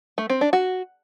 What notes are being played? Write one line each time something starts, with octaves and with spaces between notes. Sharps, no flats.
A3
C4
D4
F#4